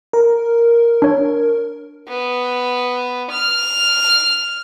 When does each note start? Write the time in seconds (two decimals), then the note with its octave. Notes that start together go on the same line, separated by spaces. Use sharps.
0.13 A#4
1.02 D4 C#5
2.08 B3
3.31 F6